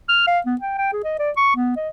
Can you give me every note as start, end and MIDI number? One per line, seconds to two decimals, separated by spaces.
0.09 0.22 89
0.27 0.40 77
0.46 0.55 59
0.61 0.75 79
0.78 0.91 79
0.93 1.01 68
1.04 1.18 75
1.19 1.31 74
1.37 1.52 85
1.56 1.74 59
1.76 1.89 75